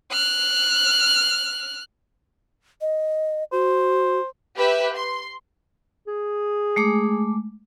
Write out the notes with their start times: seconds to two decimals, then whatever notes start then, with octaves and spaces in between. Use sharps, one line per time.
0.13 F6 F#6
2.81 D#5
3.52 F#4 C5
4.57 G4 B4 E5
4.95 C6
6.07 G#4
6.76 G#3 A3 D6